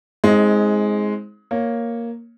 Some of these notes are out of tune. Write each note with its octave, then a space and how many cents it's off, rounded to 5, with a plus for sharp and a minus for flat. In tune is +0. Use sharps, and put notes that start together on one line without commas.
G#3 +5 C4 +20 D#4 +35
A#3 +0 C#5 +0